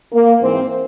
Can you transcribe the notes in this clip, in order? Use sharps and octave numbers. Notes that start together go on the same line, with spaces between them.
A#3
G#2 E3 C4